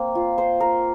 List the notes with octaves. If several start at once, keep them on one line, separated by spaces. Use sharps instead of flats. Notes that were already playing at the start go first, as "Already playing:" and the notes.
Already playing: A#3 C4
F4
C5
A#4